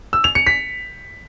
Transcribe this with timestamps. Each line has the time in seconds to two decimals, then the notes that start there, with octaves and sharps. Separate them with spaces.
0.13 E6
0.24 F7
0.35 C#7
0.47 B6